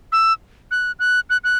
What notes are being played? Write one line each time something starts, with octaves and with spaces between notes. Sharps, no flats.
E6
F#6
F#6
F#6
F#6